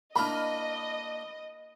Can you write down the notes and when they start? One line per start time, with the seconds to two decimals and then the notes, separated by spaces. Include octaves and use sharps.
0.16 A#3 D4 E4 D#5 B5 F6